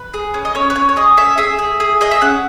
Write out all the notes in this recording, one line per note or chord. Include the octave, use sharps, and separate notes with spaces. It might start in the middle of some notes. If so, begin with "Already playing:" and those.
Already playing: B4
G#4
C#4
D#5
C#4 C#5
B4
C#4 C#5
C#5
G#4 D#5
C#4 E5
G#4 E5
G#4
G#4
G#4 D#5
E5
C#4 F#5